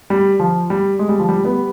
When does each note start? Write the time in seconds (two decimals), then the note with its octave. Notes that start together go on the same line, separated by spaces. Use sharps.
0.10 G3
0.39 F3
0.70 G3
0.99 G#3
1.09 G3
1.20 F3
1.29 G3
1.44 G3 B3